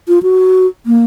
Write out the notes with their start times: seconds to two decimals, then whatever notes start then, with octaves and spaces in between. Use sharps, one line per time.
0.08 F4
0.23 F#4
0.86 A#3